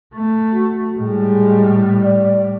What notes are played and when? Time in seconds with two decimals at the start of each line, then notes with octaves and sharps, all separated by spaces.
0.15 A3
0.53 F#4
0.98 A2 G3 G#3
2.03 D5